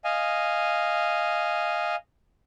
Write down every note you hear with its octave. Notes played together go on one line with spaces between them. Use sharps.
D#5 F5 G#5